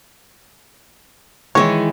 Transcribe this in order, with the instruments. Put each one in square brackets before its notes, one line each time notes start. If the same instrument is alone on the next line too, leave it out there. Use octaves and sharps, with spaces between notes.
[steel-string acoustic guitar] D#3 E3 G#3 [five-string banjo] C#5